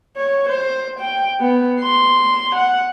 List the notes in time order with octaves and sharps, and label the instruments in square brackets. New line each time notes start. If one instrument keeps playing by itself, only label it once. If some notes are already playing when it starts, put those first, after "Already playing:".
[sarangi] C#5
C5
G5
B3
C6
F#5